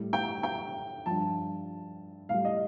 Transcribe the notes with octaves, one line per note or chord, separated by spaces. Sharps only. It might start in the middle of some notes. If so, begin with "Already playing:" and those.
Already playing: A2 G3
G5
G5
G2 F3 A5
A2 G3 F5
D#5